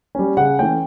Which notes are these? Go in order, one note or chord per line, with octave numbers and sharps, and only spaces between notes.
G3 C#4
C#3 F#5
E3 A3 C#4 G5